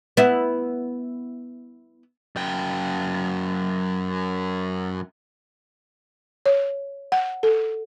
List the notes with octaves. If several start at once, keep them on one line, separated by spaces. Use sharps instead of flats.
B3 E4
F#2 G5
C#5
F#5
A4